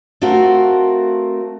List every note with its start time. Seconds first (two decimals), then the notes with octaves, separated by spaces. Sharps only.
0.21 A3 C4 F4 F#4 A#4